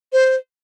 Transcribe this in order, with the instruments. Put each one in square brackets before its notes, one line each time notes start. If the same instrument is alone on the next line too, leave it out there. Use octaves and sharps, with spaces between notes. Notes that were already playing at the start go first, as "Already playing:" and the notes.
[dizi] C5